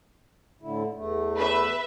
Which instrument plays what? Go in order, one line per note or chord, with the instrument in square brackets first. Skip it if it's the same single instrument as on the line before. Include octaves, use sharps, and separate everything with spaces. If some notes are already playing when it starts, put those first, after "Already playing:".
[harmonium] A2 D3 E4
E2 A3
[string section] B4 E5